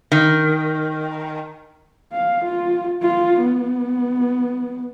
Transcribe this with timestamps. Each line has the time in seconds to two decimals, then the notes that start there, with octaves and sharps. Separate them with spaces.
0.12 D#3
2.13 F5
2.44 F4
3.02 F4
3.41 B3